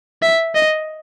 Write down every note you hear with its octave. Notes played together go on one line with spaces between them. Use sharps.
E5
D#5